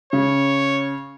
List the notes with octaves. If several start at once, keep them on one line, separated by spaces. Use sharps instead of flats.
C#3 C#5